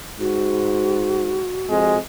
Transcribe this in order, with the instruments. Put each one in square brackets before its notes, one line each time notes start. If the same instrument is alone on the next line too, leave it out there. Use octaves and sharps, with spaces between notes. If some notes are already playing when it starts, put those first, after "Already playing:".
[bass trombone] G#2 [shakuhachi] F#4
[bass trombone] F2 [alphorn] G#3